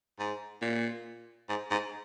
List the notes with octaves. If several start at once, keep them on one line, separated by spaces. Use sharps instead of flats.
G#2
A#2
G#2
G#2